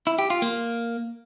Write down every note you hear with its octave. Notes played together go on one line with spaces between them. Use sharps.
E4
G4
F4
A#3